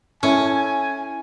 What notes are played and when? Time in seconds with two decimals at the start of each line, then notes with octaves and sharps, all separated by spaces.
0.23 C#4 E4 A4 G#5